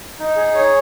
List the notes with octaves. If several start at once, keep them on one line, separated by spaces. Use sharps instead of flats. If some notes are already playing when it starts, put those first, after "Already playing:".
D#4
G#4
C#5